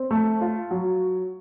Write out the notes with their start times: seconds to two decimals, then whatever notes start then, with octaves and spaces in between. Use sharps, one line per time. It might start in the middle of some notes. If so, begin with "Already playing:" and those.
Already playing: C4
0.11 A3
0.41 F4
0.71 F#3